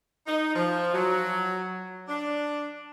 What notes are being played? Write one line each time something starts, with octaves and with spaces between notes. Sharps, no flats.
D#4
F3
F#3
D4